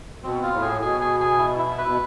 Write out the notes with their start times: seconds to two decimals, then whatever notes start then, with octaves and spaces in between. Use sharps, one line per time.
0.23 B2 C4
0.42 F4
0.52 A2
0.61 G#4
0.81 B2 G#4
1.01 G#4
1.20 G#4
1.39 E4
1.58 E4
1.78 B4
1.86 B2